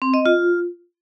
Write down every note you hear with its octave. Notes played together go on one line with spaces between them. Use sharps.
C4
D#5
F4